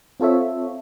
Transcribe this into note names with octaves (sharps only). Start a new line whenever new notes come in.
C4 F4 A4 C#5 E5